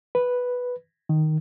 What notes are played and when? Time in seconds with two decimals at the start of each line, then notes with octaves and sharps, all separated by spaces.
0.15 B4
1.09 D#3